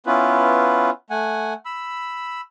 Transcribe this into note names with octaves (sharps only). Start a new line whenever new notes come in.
B3 C#4 E4 F4 B4
A3 F#5 G#5
B5 E6